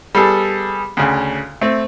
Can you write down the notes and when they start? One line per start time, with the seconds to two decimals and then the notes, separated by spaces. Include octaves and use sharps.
0.15 G3 B3 G#4 A4
0.97 D2 C#3
1.61 A3 C4